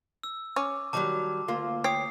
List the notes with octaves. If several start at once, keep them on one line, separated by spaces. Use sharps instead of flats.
E6
C#4 D6
D#3 F#3 G3 A5 D6
D2 A#3 F4
C#5 G5 D#6 C7